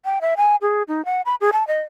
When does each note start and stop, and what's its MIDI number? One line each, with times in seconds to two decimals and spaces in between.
0.05 0.19 79
0.21 0.34 76
0.37 0.56 80
0.62 0.83 68
0.88 1.05 63
1.05 1.21 78
1.26 1.35 83
1.41 1.50 68
1.53 1.66 81
1.67 1.82 75